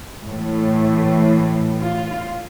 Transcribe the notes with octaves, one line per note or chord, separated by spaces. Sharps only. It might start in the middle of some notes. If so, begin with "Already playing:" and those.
A2 E3 A3
F4